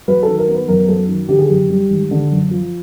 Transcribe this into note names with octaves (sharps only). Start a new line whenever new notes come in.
F#3 B4
D#3 A4
A#4
B3
B4
F#2 A#4
F#3 A4
D#3
D3 G4
G#4
F#2 G4
G3
G#1
D3
F#2
F3